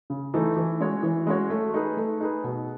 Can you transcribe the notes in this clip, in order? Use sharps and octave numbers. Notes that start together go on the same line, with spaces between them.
C#3
E3 A3 D#4
E3
G#3 C#4 F#4 C#5
E3
G#3 C#4 F#4 C#5
A3
D#4 G#4 B4
A3
D#4 G#4 B4
B2